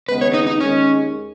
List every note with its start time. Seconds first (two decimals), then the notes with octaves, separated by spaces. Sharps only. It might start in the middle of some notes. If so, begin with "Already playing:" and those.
0.08 D#2 C#3 G#3 B3 B4
0.21 C#5
0.34 D#4
0.47 D#4
0.60 D#2 D#3 G#3 C#4